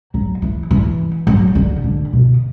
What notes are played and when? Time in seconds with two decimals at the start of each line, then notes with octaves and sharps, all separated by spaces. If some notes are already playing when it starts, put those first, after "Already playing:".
0.14 F#3
0.42 E3
0.71 E3
1.27 F#3
1.55 D3
1.84 D3
2.13 B2